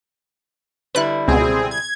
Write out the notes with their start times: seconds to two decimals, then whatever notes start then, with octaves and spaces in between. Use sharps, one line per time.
0.95 D3 G3 E4 B4 F#6
1.28 C#2 B2 C4 G#4
1.71 G#6